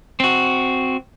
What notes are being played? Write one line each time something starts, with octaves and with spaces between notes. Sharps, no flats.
C4 F#4